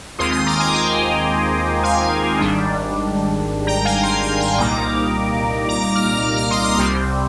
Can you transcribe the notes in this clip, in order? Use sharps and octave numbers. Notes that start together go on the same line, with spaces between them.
D#2 D#3 G#3 C4 F4 C6 D#6
C6 D#6
A#5 D6
G#5 C6
G5 A#5
F5 G#5
G#1 G#2 D#3 G3 D4
G5 A#5
F5 G#5
G#5 C6
G#5 C6
G5 A#5
C2 A#2 G3 A#3 D#4 A#5 D6
A#5 D6
A#5 D6
D6 F6
D6 F6
A#5 D6
C6 D#6
D6 F6
C2 C3 G3 C4 C6 D#6